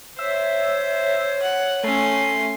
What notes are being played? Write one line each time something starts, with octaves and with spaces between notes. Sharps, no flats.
C5 C#5 E5
F#5
A3 C#4 C6